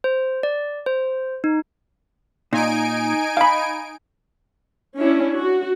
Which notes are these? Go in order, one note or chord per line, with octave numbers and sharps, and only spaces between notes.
C5
D5
C5
D#4
A#2 D#4 G#5 D7
F5 B5
C#4 D4 E4
F#4